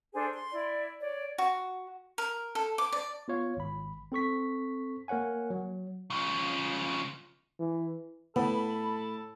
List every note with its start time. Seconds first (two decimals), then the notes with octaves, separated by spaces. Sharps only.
0.14 D4 G#4 A4 C5
0.32 C6
0.53 E4 D5
1.00 C#5 D5
1.38 F#4
2.18 A#4
2.55 A4
2.78 D6
2.92 D5
3.28 B3 F4 C#5 F5
3.57 G#1 B5
4.12 C4 A4 C#6 B6
5.08 A#3 A#4 C#5 F#5 G#5
5.50 F#3
6.10 C#3 F3
7.59 E3
8.36 A2 B3 A4 B5